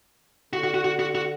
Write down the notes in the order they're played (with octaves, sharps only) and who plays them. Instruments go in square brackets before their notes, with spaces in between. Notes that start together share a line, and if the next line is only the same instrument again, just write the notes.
[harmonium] D3 [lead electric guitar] F#4
[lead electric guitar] F#4
F#4
F#4
F#4
F#4